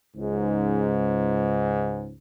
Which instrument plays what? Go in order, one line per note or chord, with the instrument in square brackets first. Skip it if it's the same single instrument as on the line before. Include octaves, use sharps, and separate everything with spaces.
[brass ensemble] C#2 G#2